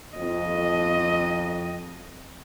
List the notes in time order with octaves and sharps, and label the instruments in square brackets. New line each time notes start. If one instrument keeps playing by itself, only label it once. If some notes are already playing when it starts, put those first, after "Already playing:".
[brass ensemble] F2 [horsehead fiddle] D#5